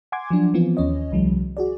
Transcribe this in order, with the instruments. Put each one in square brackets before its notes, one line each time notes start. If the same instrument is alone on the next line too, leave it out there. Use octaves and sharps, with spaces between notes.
[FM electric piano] F#5 G#5 C6 D6 G#6
F3 F#3 D4
E3 F3 B3 C4 F4
D#2 C#4 C#5 D#5
C2 E3 F#3 G#3
F#4 G#4 D5